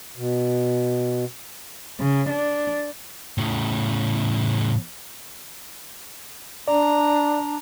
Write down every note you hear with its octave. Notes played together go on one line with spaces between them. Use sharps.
B2
C#3
D4
A2 C#3
D4 D5 A#5